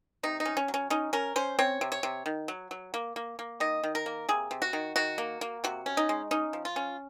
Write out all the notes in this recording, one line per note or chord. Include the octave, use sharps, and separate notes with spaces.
C3 D#4
D#4
C#4
C#4
F#3
C#4
C#4 D#4
C#4 A#4
C#4 C5
C4 C#5
C3
C#5
C3
D#3
F#3
F#3
A#3
A#3
A#3
D#3 D#5
D#3
A#4
A#3
C3 G#4
C3
F#4
D#3
D#3 F#4
A#3
A#3
C3 F#4
C#4
D#4
G#3
C#4 D#4
F3
F4
C#4